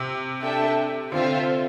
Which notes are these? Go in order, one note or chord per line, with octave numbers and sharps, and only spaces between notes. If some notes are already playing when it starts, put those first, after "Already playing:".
Already playing: C3
D4 A4 E5 G5
D3 C4 F4 C5 E5